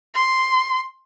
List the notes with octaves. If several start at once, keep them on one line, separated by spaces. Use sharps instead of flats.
C6